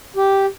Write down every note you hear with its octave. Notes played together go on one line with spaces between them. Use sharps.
G4